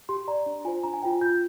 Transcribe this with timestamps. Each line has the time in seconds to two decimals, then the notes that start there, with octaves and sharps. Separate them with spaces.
0.09 G4 C6
0.28 D5 A#5
0.46 D4
0.65 F4 C5 G#5
0.83 D4 A#5
0.93 G#5
1.03 F4 C5 G5
1.21 F4 G6